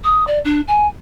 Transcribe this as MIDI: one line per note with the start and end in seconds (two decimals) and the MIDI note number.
0.04 0.25 87
0.27 0.39 74
0.45 0.61 62
0.68 0.87 80